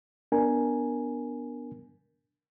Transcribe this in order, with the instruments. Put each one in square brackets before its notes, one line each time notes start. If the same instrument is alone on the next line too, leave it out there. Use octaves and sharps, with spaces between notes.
[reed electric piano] B3 D4 A#4 G#5